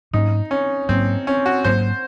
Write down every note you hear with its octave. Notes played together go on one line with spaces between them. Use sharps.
G#2 F#3 A#3 C#4 D#4
C#4
G#2 F#3 A#3 C4 C#4
C#4
F#4
G#2 F#3 A#3 C#4 C5